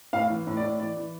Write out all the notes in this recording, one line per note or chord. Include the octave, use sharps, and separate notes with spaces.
A2 F5
E3
A2
D5
A2
E3 D5
E3